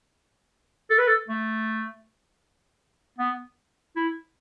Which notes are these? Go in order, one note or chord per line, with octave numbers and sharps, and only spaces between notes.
A4
B4
A4
A3
B3
E4